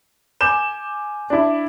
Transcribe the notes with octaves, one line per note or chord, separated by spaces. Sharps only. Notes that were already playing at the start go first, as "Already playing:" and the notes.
G#5 D6 G6 E7
D4 E4